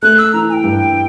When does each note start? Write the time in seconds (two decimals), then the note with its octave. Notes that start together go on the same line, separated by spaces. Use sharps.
0.02 A3 F#6
0.18 E6
0.33 E3 A#5
0.49 G#5
0.53 G5
0.64 G2